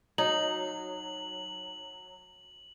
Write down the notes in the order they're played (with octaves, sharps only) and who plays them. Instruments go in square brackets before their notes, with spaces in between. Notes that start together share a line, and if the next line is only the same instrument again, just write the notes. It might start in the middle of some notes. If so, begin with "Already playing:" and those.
[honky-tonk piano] F#3 [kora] D#4 [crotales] F#7